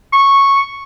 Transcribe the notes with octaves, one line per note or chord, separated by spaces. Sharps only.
C#6